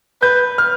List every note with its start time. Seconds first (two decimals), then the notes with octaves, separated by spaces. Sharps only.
0.21 B4 G6
0.58 F6